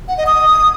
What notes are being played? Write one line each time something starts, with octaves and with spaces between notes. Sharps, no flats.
F#5
D#5
D#6